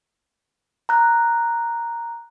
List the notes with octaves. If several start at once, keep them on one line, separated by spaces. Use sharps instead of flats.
A#5 F#6